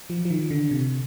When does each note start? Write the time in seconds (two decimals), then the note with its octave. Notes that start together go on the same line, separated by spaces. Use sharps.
0.10 F3
0.25 F3
0.30 D#3
0.50 D3
0.71 C3